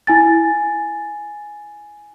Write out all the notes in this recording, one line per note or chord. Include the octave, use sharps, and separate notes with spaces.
E4 G#5 A6